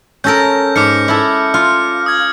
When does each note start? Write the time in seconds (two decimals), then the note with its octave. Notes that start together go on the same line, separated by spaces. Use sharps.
0.24 C#4 A4 A#4 G6 A#6
0.76 G#2 D6 F6 C#7
1.08 E4 A4
1.54 F4 F6
2.06 D#6 G#6